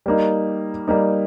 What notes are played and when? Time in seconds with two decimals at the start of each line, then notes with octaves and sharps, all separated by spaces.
0.06 G3 A#3 D#4
0.88 G3 A#3 D#4